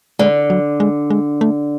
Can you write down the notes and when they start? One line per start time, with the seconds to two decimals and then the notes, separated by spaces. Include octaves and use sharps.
0.19 D3 G#3
0.50 F#3
0.80 G#3
1.10 G#3
1.41 A3